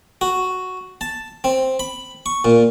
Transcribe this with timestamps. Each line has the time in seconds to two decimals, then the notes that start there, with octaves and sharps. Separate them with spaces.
0.21 F#4
1.01 A5
1.44 C4
1.80 B5
2.26 C#6
2.45 A#2